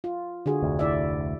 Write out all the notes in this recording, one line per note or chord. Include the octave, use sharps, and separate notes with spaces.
F4
D3 F#4 G#4
F1 D2
E4 D5 E5